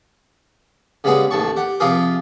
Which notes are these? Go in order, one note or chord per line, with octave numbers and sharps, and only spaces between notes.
C#3 G3 G#3 B3 G#4
A1 D#2 A5 C#6
G4 F#5
C3 F3 F4 G4 G#4 A#4